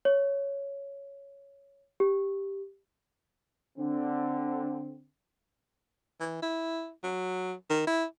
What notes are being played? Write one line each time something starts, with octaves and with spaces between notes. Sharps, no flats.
C#5
G4
D3 C4
E3
E4
F#3
D#3
E4